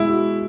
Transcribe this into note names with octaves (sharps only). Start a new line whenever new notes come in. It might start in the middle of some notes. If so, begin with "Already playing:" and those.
Already playing: B2 G#3 E4
F#4